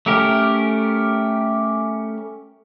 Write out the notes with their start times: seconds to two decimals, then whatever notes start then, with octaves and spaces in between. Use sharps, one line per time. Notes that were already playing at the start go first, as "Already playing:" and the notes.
0.06 A3 C#4 G4 A#4